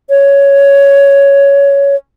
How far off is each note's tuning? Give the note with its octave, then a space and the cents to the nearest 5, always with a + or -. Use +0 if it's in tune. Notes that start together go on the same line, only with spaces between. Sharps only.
C#5 +10